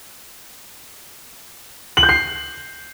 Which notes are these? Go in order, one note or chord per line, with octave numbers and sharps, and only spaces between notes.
F#7
G6
C7